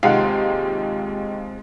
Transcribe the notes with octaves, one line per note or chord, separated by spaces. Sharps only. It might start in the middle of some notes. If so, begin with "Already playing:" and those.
D#2 C3 G#3 D#4 F4 F5 F#5 C6